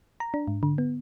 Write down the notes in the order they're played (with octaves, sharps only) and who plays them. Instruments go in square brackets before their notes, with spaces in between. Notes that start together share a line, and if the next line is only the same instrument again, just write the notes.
[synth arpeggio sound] A#5
D4
G#2
D3
B3